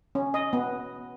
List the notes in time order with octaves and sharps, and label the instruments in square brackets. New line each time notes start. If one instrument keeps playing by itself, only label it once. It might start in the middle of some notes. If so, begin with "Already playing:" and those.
[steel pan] C#4
D#5
B3